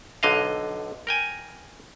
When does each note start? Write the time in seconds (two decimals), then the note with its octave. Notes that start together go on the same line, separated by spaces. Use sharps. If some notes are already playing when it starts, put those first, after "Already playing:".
0.23 B1 D3 D#5 F5
1.07 A#4 G5 G#5